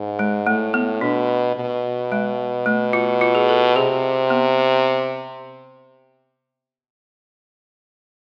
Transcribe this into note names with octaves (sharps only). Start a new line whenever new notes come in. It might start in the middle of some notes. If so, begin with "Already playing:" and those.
Already playing: G#2
G#3
A2 A3
B3
B2 D4
B2
G#3
A3
F4
F4
G#4
A4
C3 G#4
B3